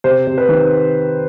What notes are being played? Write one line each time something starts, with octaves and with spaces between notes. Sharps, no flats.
C3 C5
C3
B4
D#3